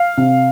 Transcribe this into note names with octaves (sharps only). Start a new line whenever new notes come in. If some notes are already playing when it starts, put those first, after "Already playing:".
Already playing: F5
C3